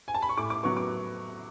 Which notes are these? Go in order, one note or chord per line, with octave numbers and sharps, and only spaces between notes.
G#5
A5
B5
C#6
A2 D6
D6
F#3 B3 C#6
D6